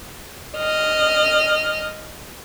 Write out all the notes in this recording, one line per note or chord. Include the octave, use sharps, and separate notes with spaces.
D#5 F6